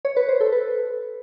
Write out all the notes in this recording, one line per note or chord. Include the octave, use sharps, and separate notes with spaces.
C#5
B4
C5
A4
B4